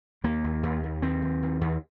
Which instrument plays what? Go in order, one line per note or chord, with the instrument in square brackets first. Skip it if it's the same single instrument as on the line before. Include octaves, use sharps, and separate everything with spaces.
[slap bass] D#2 A#3
D#2
D#2
D#2
D#2 C4
D#2
D#2
D#2